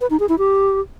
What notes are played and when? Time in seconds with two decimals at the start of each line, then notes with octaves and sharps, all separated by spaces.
0.01 B4
0.10 D#4
0.20 G#4
0.29 E4
0.38 G4